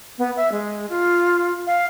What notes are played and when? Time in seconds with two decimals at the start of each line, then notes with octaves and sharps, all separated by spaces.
0.18 B3
0.36 E5
0.52 G#3
0.90 F4
1.67 F5